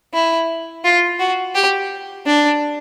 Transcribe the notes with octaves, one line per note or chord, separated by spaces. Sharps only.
E4
F4
F#4
G4
D4